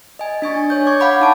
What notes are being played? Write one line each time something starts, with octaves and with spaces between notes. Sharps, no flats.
D#5 G#5
D4 G#5 C#6 A6
C#5 G6
C#6 D6 G#6
F5 F#5 B5 D6
D#4 A5 D7